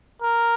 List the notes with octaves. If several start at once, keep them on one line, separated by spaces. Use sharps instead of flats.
A#4